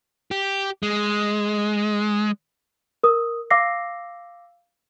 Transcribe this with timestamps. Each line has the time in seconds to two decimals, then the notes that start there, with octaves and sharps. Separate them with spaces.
0.31 G4
0.83 G#3
3.03 A#4 D#6
3.51 F5 D6 E6 A#6 C7